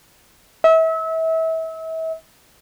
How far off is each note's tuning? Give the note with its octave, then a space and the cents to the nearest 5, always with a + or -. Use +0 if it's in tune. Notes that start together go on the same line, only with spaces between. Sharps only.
E5 -35